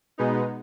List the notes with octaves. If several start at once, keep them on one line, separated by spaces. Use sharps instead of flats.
B2 G#3 B3 D#4